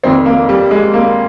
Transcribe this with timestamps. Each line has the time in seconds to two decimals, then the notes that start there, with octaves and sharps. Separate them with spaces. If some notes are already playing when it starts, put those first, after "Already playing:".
0.03 F1 F2 D#3 C4
0.26 A#3
0.49 G3
0.71 G#3
0.94 A#3